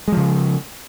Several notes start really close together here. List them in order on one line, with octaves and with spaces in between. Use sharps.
G#3 F3 C#3